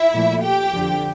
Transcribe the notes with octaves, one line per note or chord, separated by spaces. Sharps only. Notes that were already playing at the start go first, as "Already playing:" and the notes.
Already playing: E4 E5
A#2 F3 A3
G4 G5
F2 D3 F3